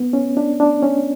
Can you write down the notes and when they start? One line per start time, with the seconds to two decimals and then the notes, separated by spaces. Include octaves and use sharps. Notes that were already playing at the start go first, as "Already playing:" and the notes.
Already playing: B3
0.13 C#4
0.37 D4
0.60 D4
0.83 C#4